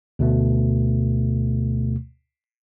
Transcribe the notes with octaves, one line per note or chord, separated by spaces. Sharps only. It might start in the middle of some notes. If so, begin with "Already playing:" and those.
D2 B2 A3